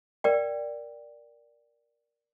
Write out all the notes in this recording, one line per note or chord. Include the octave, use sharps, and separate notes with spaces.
A#4 D5 G5